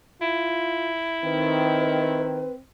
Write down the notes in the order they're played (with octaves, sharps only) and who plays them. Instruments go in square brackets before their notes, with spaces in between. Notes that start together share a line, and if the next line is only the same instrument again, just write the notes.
[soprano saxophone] E4 [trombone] F4
[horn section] D#3 [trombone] C4 [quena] B4